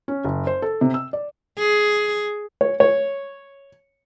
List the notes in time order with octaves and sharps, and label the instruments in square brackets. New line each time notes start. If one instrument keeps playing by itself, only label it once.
[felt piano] C#4
F#1
C5
A4
C3
E6
D5
[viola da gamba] G#4
[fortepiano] C#5
C#5